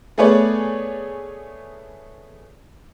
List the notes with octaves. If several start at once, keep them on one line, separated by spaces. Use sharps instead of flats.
A3 B3 G#4 B4 C#5 D5